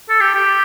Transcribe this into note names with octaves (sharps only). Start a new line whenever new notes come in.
A4
G4
G4